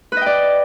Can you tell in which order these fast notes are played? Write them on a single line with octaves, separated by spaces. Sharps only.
B4 D#5 G5 D5